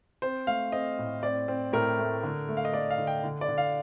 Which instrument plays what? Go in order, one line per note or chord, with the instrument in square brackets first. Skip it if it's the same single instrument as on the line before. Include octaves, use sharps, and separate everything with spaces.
[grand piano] C4 C5
A3 F5
C4 D#5
A2
C4 D5
C4
A2 A#4
A3
D3
A3
F5
D#5
A3 D5
F5
D3
G5
D3
D5
D3
F5